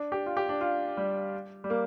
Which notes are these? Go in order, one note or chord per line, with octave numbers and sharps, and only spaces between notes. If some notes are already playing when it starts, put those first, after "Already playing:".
Already playing: D4
G4
F4
G4
D4
F4
G3
G3
A#3